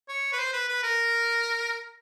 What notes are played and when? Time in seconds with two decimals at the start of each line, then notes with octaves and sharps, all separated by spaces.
0.08 C#5
0.32 B4
0.39 C5
0.53 B4
0.68 B4
0.83 A#4